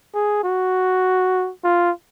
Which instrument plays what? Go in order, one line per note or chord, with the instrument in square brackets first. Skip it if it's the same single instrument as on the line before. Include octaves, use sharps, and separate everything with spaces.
[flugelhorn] G#4
F#4
F4